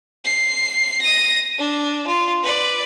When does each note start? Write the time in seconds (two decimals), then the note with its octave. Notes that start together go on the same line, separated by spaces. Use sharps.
0.25 C7
1.01 A#6 D#7
1.58 D4
2.07 F4
2.43 B4 D5